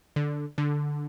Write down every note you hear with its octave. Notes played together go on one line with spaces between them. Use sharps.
D3
D3